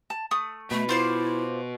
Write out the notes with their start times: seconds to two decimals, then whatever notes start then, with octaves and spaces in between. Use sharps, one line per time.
0.10 A5
0.31 A3 D#6
0.71 B2 A3 B5
0.89 E4 F4 C5 D5